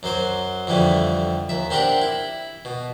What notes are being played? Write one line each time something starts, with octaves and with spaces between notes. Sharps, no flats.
F#2 F#3 C5 D6
F2 D3 E3 G3 A3
D#2 E5
C4 D4 G4 A#4 E5 F#5
E4
B2